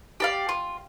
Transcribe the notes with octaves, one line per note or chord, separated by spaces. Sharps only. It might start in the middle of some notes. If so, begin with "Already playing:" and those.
G4 D5 F5
F4